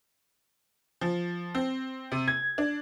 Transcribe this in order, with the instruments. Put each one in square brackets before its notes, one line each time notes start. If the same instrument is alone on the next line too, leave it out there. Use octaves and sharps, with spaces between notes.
[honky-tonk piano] F3
C4
C3
G#6
D4